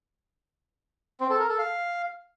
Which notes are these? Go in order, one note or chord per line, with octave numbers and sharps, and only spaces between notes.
C4
A4
A#4
A4
F5